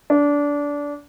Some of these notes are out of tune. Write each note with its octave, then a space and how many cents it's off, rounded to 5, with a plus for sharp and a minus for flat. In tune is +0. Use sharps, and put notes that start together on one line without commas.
D4 -20